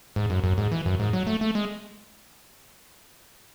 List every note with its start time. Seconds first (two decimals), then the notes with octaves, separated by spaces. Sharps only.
0.16 G#2
0.30 F#2
0.44 F#2
0.58 G#2
0.72 E3
0.86 F#2
1.00 G#2
1.13 F#3
1.27 A3
1.41 A3
1.55 G#3